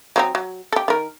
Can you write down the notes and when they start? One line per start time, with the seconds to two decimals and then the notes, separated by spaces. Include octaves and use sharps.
0.16 F#3 C4 D#4
0.35 F#3
0.72 G4 A4
0.88 D#3 A#4